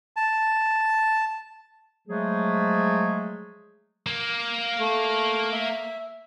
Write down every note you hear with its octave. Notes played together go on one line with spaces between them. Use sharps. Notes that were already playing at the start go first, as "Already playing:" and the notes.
A5
F3 F#3 G#3 A3 G#4
A#3
A3
E5